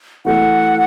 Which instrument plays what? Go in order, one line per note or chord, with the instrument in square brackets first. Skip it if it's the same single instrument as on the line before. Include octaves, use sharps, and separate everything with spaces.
[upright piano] E3 A3 F#4 [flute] F#5